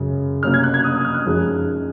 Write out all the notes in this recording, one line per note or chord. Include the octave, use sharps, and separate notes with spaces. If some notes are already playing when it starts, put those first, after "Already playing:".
Already playing: F#2 C#3 G#3
C3 F#3 A#3 C#4 F6
G#6
F#6
G#6
D#6
D#6
F6
F#6
F#2 F3 G#3 D#4